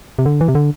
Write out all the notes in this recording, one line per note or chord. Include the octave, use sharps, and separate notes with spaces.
C3
D3
E3
C3
D3